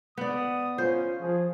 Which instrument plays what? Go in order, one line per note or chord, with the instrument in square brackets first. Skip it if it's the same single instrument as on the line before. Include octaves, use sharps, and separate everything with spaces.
[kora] B3 D5 [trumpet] D#6
[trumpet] C#4 [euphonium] F4 [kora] C5
[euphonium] F3 [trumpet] G#4